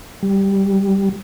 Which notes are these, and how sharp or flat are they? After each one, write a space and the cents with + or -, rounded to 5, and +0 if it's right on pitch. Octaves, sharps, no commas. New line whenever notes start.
G3 +0